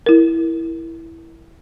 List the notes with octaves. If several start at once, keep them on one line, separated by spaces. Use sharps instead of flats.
E4 A#4